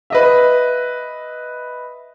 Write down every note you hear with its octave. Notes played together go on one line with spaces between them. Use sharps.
B4 D#5 E5